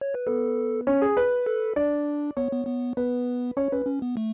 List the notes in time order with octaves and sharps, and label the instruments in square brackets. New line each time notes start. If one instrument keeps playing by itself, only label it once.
[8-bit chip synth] C#5
B4
[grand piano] B3 [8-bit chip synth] A4
[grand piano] C#4
G#4
B4
[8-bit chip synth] A4
[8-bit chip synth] D4 [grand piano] D5
[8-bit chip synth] B3 [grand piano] C#5
[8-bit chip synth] B3
B3
[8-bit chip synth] B3 [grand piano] B4
[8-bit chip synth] C#4 [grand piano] C#5
[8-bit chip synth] C#4 [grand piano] B4
[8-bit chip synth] C#4
B3
A3